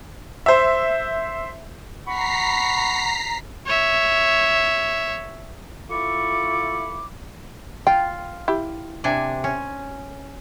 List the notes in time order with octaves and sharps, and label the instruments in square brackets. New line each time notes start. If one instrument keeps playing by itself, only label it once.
[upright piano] C5 E5
[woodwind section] F#5 B5 C#6 [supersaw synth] A#5 B6 C7
[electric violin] C#5 E5
[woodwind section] E4 F4 A4 B5 C#6 D6
[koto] F4 [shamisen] G5
[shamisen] E4 G4
[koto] C3 D4 G#5
C#4